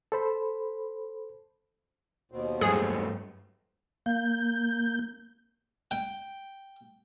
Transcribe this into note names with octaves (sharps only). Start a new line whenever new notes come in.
A4 C5 B5
D#2 B2 C4
G2 F#3 A3 G#4
A#3 G6
G5